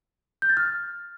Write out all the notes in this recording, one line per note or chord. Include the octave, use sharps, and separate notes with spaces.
G6
A6
F6